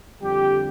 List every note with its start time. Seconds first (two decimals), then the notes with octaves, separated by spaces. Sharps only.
0.22 F2 D3 G3 G4